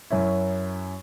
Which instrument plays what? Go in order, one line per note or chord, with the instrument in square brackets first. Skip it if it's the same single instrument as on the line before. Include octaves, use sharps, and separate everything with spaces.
[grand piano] F#2 F#3 C#4 E4